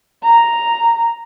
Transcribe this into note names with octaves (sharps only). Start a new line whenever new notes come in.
A#5